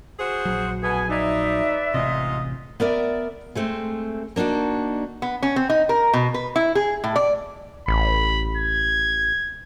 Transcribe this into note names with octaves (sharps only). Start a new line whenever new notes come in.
F#4 G#4 C5
A#1 F#3
B2 A3 B3 G#4 G#5
D#4 B4 D5 E5
A1 G#2 C3 F4 D#5
B3 A#4 D5 E5
G#3 A3 C4
A#3 D4 D#4 F#4
B3
C#4
C4
D#4
A#4
B2
B4
E4
G#4
A2
D5
A1 B5
G#6